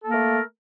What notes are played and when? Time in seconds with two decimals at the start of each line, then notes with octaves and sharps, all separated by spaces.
0.03 A4
0.06 A#3
0.09 A#4
0.12 A3